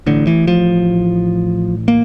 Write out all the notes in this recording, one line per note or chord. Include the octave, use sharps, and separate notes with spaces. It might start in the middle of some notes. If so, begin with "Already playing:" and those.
A1 A2 D3
E3
F3
A#3